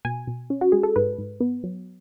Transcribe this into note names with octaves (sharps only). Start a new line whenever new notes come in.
B2 G#5
B2
C#4
F#4
G#3 G#4
A4
G#2 B4
G#2
B3
F#3